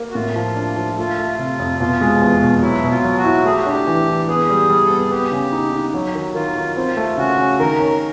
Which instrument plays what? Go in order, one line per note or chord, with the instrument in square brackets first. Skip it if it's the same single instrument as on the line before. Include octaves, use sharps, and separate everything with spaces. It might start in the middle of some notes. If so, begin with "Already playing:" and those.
Already playing: [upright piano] A#3
[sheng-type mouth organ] F#4
[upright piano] A2 [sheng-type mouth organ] F4
[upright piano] F3
D4
F3
[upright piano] A3 [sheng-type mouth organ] F4
[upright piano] A3
[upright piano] C3 [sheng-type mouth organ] F4
[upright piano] F2
[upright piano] B2 [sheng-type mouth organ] F4
[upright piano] G#3
E2
B2
[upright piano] F#3 [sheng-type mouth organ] E4
[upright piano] B2
[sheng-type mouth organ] F4
[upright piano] F#3
[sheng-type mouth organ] F#4
[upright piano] E4
[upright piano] A3 [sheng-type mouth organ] G#4
[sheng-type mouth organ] G4
F#4
[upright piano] D4 [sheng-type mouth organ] G4
[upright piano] E3
E3
[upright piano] B3 [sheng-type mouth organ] G#4
[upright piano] G3
G3
[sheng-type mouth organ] A4
[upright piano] B3
[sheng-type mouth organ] G#4
[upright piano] B3 [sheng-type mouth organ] G4
[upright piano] C#3
D#4
D#4
F#3
D#3
[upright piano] D#3 [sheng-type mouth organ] F4
[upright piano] D#3
[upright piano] C4 [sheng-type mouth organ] F4
[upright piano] A3
[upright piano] C#3 [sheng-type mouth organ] F#4
[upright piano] C#3
[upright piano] D#3 [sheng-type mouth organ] A#4
[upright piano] C#4